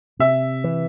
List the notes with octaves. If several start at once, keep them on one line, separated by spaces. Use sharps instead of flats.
C3 E5
E3